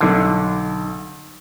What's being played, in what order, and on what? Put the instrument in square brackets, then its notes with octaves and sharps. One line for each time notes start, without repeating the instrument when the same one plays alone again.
[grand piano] B1 A4 D6 [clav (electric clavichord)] D3